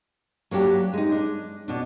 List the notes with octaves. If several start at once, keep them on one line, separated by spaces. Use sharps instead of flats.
F#3 A#3 D4 G4
G#3 D#4
D4
B2 D4